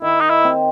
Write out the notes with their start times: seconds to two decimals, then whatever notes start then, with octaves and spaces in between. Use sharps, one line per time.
0.02 D#3 E4
0.21 D#4
0.30 E4
0.44 C4